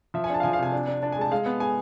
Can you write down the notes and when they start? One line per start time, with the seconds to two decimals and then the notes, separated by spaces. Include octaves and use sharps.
0.14 F3 E5
0.24 G#5
0.30 D4 A5
0.40 F5
0.43 F3 G#5
0.53 F5
0.59 C3 G#5
0.72 D4
0.88 D4
1.03 D4 A5
1.12 G#5
1.17 G#3 A5
1.31 G#3 F5
1.46 B3
1.60 G#3 G#5